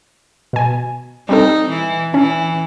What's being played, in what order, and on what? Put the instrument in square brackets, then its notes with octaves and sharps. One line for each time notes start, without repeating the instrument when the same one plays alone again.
[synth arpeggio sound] B2 G#5
[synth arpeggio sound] G3 C4 A4 [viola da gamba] D#4
[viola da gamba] E3
[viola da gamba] E3 [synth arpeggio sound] C#4